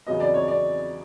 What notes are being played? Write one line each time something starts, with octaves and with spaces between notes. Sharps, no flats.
E2 C#3 F#3 B3 D#5
D5
C#5
D5